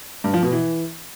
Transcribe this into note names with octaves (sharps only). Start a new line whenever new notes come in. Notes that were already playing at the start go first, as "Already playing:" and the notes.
G2
F3
B2
E3